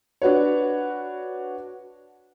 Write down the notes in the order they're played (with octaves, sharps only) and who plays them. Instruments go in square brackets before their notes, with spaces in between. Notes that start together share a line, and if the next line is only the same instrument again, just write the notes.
[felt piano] D4 F#4 B4 C#5